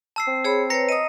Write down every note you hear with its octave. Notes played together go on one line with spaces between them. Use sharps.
A5 E6 C7
C4
G#4 C#5 B5
B4 C#5 A#5 A#6 C#7
D#5 D#6 D#7